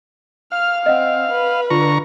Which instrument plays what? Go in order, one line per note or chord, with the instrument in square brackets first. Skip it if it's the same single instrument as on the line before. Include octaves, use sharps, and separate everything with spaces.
[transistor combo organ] F5 [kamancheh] F6
[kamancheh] C4 [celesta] D#5 F#5
[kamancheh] B4
[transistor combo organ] D3 A#5 C#6 [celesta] F4